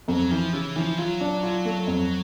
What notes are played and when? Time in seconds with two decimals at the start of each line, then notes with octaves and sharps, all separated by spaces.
0.08 F2 F#3
0.30 E3 F3
0.53 C#3 E3
0.76 E3 F3
0.98 F#3 F4
1.21 D4
1.43 F4
1.65 A3
1.87 F2